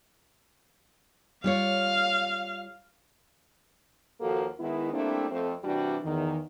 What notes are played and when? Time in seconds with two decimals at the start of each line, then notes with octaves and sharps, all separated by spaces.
1.44 G3 F4 C#5 F5
4.20 D#2 F3 A#3 F#4 A4
4.59 D#3 G#3 B3 E4
4.93 G3 A3 A#3 C4 D4 E4
5.30 F2 A3 C4
5.64 C3 E3 G3 D4 F#4 G4
6.04 E2 D#3